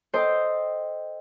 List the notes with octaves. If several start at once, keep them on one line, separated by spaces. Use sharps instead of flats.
A4 C5 D#5 G5 A5